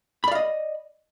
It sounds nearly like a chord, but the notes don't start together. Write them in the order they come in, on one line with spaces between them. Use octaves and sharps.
B5 D5 F5 D#5